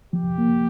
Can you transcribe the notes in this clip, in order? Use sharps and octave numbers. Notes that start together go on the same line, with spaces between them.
F3 G4
A#3